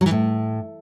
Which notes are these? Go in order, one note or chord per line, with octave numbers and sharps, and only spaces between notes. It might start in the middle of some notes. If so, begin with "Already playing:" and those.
F#3
E3
A2